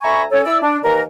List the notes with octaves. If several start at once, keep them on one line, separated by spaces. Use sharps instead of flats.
D2 E5 G#5 A#5 B5 C#6
C#4 A4 C#5
E4 D5 E6
D4
D#2 E3 A#4